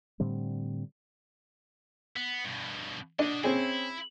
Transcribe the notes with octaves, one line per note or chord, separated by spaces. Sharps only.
A2 D3 G3 C4
B3
G2 B2
D4 F#4 D#5
C4 C#4 E4 G#4